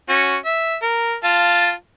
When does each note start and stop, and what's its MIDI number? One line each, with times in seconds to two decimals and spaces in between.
0.09 0.36 61
0.09 0.36 66
0.46 0.76 76
0.82 1.16 70
1.24 1.72 65
1.24 1.72 77
1.24 1.72 81